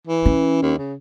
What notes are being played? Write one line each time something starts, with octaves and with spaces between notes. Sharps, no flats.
E3
C#4
D#2
C#3